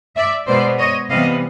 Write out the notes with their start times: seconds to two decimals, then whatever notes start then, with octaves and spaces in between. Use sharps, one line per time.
0.16 D5 E5
0.47 B2 G#3 B3 C5 D5
0.78 C#5 D#5
1.09 C3 E3 G3 B3 D#5 F5